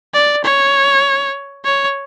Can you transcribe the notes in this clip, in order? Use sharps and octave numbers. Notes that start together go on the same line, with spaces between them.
D5
C#5
C#5